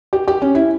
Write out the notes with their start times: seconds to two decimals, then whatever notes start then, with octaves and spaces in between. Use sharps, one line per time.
0.13 G4
0.28 G4
0.42 C#4
0.55 E4